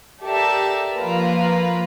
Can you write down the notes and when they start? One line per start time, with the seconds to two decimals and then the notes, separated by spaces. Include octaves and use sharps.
0.23 G4 A4 A#4 D5 E5 A5
0.96 F3 A#3 F4 A#4 B4